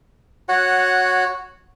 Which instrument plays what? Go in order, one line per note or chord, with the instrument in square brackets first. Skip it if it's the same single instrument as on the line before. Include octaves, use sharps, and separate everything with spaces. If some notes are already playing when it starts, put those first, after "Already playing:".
[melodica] F#4 C#5 F#5